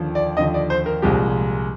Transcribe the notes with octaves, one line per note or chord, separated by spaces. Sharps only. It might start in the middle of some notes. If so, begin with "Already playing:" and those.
Already playing: D#2 D3 F3
D5
D#2 D3 F3 D#5
D5
C5
A#4
C2 A#2 F3 G#3 G4